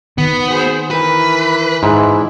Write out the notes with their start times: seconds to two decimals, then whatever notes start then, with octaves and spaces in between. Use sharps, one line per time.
0.18 D#3 B3
0.48 F#4 G#4 C5
0.91 E3 A#4 B4
1.83 G#2 E3 E4